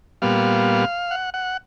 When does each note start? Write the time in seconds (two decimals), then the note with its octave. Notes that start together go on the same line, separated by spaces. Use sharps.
0.22 A#2 G3 B3 F5
1.11 F#5
1.34 F#5